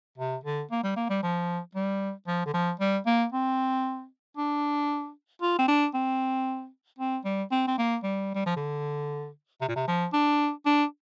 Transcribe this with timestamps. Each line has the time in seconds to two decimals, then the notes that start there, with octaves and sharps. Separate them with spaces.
0.18 C3
0.44 D3
0.71 A#3
0.83 G3
0.96 A#3
1.10 G3
1.23 F3
1.75 G3
2.27 F3
2.46 D3
2.53 F3
2.80 G3
3.06 A#3
3.32 C4
4.37 D4
5.42 F4
5.59 C4
5.68 D4
5.94 C4
6.99 C4
7.25 G3
7.52 C4
7.67 C4
7.78 A#3
8.03 G3
8.35 G3
8.46 F3
8.56 D3
9.61 C3
9.68 A#2
9.76 C3
9.87 F3
10.13 D4
10.66 D4